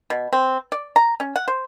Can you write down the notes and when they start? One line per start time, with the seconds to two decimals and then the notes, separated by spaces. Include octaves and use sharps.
0.10 B2
0.33 C4
0.72 D5
0.96 A#5
1.20 C#4
1.36 F#5
1.48 C5